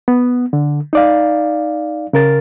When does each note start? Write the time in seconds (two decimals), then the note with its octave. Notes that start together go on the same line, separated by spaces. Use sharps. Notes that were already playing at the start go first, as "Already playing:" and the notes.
0.08 B3
0.53 D3
0.93 D#4 D5 F5
2.13 C#3 A#4 A6